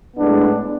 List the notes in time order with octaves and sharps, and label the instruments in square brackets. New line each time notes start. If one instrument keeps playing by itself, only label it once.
[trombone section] A2 G#3 B3 D4